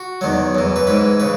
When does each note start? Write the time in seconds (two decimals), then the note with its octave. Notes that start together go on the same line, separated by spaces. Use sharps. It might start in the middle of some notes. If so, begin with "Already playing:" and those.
Already playing: F#4
0.21 E2 D#3 F#3
0.55 F#2 E3
0.76 B4
0.87 G#2 E3 B4
1.20 C#3 B4